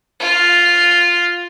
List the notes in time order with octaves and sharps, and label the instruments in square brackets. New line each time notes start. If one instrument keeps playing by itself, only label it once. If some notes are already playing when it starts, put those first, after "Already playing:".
[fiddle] F4